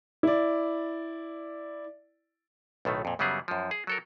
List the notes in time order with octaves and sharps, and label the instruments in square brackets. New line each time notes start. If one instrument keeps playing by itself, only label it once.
[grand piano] E4 D5
[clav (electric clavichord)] B1 A2 D#3 A3
F2 A#2
F#2 C#3 F#3 G3 B3 G#4
F#2 F3
G#4
F#3 A4 A#4